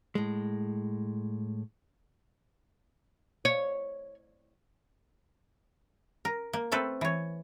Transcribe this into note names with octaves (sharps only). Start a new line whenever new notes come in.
A2 G#3
C#5
A#4
A#3
A3 C4 A4 B4
E3 C#5